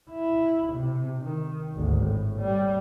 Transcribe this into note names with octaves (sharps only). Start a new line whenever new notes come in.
E4
C3
D#3
G#1 D2
A2
G3